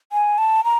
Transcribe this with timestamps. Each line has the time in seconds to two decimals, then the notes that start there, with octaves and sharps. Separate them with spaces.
0.12 G#5
0.38 A5
0.64 A#5